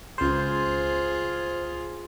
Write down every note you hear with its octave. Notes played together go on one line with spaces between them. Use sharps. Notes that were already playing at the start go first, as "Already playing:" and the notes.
C#2 F4 G#4 C5